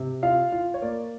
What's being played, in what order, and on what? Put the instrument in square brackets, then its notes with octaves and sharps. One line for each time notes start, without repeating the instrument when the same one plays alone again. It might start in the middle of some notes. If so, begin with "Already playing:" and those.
Already playing: [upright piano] C3
F4 F5
F4
C#5
A#3 D5